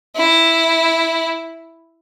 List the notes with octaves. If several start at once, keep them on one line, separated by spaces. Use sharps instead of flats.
E4